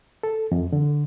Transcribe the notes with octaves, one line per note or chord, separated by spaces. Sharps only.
A4
F2
D3